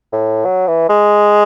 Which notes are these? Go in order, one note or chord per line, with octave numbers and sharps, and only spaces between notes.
A2
F#3
E3
G#3